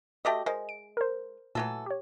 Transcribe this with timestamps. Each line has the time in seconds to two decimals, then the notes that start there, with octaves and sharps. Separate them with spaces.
0.25 A3 F#4 G4 D#5 E5 G5
0.46 G#3 A#4 C5 D#5
0.69 D7
0.97 A#4 C5
1.55 A#2 E3 F#3 A3 A4
1.86 G4 C#5